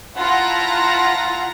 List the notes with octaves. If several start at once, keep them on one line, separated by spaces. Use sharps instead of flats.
E4 F4 F#5 A5 A#5 A#6